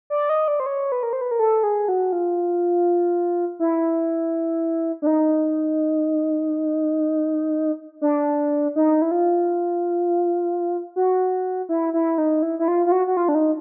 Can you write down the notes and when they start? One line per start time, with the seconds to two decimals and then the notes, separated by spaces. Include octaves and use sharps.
0.10 D5
0.29 D#5
0.48 D5
0.60 C5
0.66 C#5
0.92 B4
1.03 A#4
1.13 C5
1.21 B4
1.31 A#4
1.39 A4
1.63 G#4
1.88 F#4
2.12 F4
3.59 E4
5.02 D4
5.07 D#4
8.01 D4
8.76 D#4
9.02 E4
9.11 F4
10.96 F#4
11.69 E4
11.94 E4
12.18 D#4
12.42 E4
12.59 E4
12.68 F4
12.86 F4
12.92 F#4
13.07 F#4
13.17 F4
13.29 D4
13.35 D#4